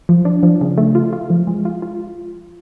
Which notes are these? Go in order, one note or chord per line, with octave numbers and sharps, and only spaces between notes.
F3
D4
F3
C#3
A3
F4
F4
F3
G#3
F4
F4